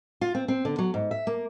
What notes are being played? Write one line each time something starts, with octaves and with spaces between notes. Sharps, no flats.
F4
C4
C4
D3
F#3
G#2
E5
A#3